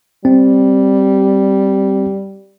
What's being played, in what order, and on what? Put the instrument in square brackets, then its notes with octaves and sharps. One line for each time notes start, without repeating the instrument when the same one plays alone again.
[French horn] G3 [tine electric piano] C4